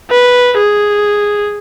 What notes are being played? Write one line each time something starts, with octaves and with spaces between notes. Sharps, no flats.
B4
G#4